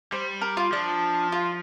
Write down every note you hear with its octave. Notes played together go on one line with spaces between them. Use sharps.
G3 C5
A#4
F4
F3 D4
F4